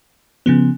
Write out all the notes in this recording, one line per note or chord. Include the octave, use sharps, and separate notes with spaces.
C#3 F3 B3